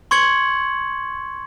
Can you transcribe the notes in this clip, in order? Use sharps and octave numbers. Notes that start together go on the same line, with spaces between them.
C6 C#6 G#6 C#7 F#7